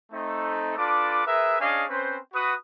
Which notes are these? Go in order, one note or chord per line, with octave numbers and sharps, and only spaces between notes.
A3 C4 D#4
D4 F4 A4 B4 D6
G#4 A#4 B4 E5
C#4 D4 G#4 D#5 F5 G#5
C4 C#4 B4 C5
F#4 B4 D#6